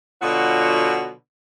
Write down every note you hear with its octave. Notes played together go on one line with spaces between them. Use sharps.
B2 D3 F#3 F4 F#4